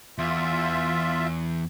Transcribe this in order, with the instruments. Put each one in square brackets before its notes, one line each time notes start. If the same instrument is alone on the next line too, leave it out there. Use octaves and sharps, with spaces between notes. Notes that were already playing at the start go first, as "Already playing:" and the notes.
[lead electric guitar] E2 [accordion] F4 E5